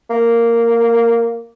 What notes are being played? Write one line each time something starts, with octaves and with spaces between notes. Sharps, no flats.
A#3